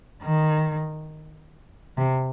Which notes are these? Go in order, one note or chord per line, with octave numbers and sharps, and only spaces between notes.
D#3
C3